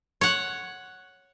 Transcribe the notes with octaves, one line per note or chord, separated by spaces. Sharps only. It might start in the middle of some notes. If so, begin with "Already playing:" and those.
C#5 F#5